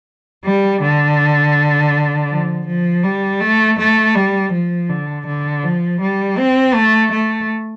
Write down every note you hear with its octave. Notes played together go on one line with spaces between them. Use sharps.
G3
D3
F3
F3
G3
A3
A3
G3
F3
D3
D3
F3
G3
C4
A3
A3